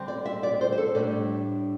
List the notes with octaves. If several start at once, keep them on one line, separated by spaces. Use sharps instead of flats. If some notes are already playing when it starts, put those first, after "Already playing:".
Already playing: D3 G3 C4
D5
E5
D5
C5
C5
A4
A2 G3 D4 D5